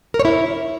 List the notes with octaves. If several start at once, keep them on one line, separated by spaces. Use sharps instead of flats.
A#4
C#5
E4